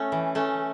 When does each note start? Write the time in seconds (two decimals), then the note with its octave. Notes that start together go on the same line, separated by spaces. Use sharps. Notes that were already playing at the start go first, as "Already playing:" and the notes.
Already playing: A3 C#4
0.12 E3
0.35 A3 C#4